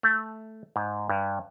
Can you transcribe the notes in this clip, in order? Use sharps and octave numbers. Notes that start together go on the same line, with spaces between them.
A3
G#2
G2